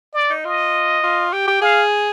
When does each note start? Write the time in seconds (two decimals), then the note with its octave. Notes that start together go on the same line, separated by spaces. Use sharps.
0.14 D5
0.30 D#4
0.44 F4 D#5
1.03 F4
1.32 G4
1.48 G4
1.61 G#4 F5